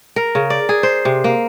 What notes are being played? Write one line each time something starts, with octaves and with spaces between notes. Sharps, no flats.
A#4
C#3
D5
G#4
C5
C3
A#3